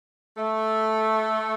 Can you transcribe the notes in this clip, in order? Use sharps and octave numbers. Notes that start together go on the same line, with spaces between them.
A3